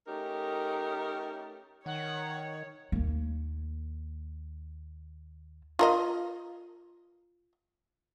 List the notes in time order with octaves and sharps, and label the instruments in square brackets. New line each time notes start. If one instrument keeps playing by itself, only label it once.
[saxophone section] A3 C#4 D#4 G4 A#4
[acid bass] D#3 [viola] C#5 [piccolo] F#5
[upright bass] D#2 A#3
[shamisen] F4 A#4 D#5